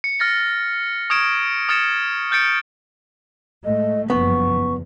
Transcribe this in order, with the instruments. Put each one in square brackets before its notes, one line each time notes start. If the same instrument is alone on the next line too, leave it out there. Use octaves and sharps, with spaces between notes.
[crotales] C#7
F6 A6 A#6 C#7
C#6 D#6 F6 G#6 D7 E7
D#6 F6 A6 C#7 E7
F6 G6 A6 C#7 D7
[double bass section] A2 G#3 A3 [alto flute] D#5
[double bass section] F#1 G2 F3 [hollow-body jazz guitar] B3 [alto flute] C#6
[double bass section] E2